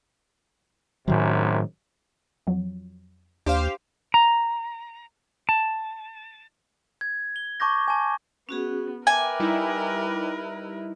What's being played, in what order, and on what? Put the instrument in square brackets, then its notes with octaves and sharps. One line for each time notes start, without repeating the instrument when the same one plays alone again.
[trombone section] G#1 F#2 C3 [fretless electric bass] A2 D#3 F#3
[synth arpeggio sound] F2 F#3
[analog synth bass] D#2 [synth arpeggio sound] D4 [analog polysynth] G4 C5 F5
[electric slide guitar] A#5
A5
[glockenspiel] G#6
G7
A5 C#6 D6 G6 A#6
G#5 A5
[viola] B3 [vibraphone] C#4 F#4 G#4
[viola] A#4 B4 [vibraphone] E5 G5 D6 [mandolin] G#5
[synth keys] G3 D#4 E4